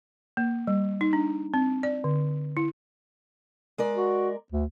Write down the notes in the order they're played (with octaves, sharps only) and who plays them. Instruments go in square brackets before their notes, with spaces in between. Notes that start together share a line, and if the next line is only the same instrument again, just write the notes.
[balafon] A#3
G3
D#4
D4
C4
D5
D3
E4
[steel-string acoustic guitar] G#3 A#4 D5
[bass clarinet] F#4
D2